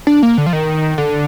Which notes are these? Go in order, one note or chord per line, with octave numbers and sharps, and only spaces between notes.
D4
A#3
D3
F3
D#3
D3